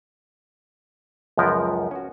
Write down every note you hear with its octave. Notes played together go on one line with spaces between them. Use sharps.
C#2 F#2 F3 B3 A#4
C#4 F#4